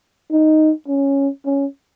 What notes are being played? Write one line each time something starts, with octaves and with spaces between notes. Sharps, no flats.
D#4
C#4
C#4